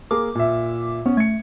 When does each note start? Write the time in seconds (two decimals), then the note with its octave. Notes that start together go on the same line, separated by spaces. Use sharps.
0.11 A#3 G#4 A#4 D6
0.35 A#2 E5
1.06 B3 C#4
1.17 A3 G#6 C#7